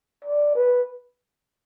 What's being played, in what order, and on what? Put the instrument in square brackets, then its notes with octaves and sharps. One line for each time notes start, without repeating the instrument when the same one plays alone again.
[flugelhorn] D5
B4